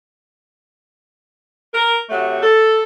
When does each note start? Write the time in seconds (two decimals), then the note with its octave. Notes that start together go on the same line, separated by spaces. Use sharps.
1.73 A#4
2.10 C3 F#3 A3
2.42 A4